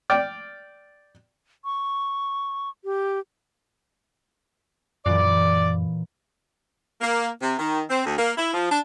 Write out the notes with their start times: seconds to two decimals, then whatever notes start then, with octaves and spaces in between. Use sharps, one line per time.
0.10 D5 G5 D6 F6
1.65 C#6
2.85 G4
5.06 F#2 A#2 E3 D5
7.01 A#3
7.42 C3
7.59 D#3
7.90 C4
8.06 D2
8.18 A#3
8.38 E4
8.54 F3
8.71 D4